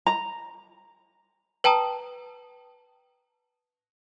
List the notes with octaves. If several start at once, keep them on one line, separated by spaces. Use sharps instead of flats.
A#5
B4 G5 A5 A#5 D#6